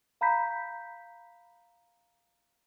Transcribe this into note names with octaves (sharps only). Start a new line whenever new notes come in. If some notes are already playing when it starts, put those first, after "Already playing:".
F5 A#5 B5 G6 B6